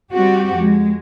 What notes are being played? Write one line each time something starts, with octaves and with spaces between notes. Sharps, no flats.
G3 C4 F#4 G4
F2 G#3